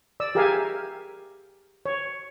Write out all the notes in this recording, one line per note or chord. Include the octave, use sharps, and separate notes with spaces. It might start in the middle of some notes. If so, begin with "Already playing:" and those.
D5 E6
G4 G#4 A#4 E5 F5 G#5
C#5